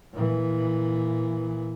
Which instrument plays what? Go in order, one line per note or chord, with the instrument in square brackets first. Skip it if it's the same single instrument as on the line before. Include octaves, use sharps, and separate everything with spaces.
[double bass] A#2 E3